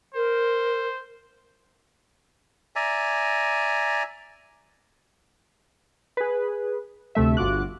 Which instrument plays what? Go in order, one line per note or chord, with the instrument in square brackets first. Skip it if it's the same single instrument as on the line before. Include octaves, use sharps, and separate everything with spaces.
[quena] A#4 [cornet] C5
[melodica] D5 E5 G#5 A#5
[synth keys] G#4 B4
D2 C3 A3 E5
G1 F4 F#4 D6 F#6